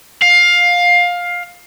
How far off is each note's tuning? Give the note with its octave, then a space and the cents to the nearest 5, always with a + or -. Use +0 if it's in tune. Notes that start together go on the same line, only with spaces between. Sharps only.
F5 +15